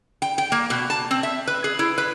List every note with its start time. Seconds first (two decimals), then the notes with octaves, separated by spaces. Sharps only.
0.22 G5
0.38 G5
0.52 A#3
0.70 B2
0.90 A5
1.11 C4
1.23 E5
1.47 B4
1.64 G#4
1.79 E4
1.98 B4